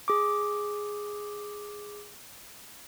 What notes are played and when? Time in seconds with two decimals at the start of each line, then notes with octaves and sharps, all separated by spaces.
0.08 G#4 D6